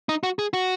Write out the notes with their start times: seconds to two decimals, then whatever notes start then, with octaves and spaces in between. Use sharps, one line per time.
0.09 D#4
0.23 F#4
0.39 G#4
0.53 F#4